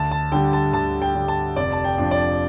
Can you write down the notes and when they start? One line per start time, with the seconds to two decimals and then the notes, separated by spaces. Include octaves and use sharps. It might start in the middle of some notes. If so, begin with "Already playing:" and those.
Already playing: D2 A5
0.11 A5
0.32 D3 G3 G5
0.53 A5
0.73 D2 A5
1.02 G5
1.15 D3 G3
1.28 A5
1.56 F1 D5
1.73 A5
1.84 G5
1.98 F2 F3 D4
2.11 D5